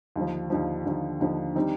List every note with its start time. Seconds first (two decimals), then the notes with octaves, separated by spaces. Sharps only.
0.16 D#2 D3 F3
0.50 D#2 D3 F3
0.85 D#2 D3 F3
1.21 D#2 D3 F3
1.55 D#3 G3 C4 D#4